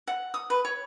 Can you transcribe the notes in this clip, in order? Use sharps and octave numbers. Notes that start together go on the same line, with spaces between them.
F#5
D#6
B4
C#5